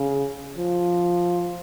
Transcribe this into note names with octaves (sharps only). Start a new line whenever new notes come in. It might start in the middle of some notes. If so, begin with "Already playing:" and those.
Already playing: C#3
F3